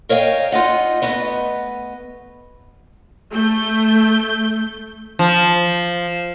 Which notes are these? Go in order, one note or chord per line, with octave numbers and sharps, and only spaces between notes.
A#4 C#5 D#5 F5 G5
D#4 F4 D#5 F#5
A3 B3 B4 D#5
A3 G6
F3